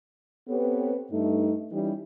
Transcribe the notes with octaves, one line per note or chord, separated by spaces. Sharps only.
B3 C4 G4 A4 B4 C#5
G2 A3 D#4
E3 G3 C#4 D#4 E4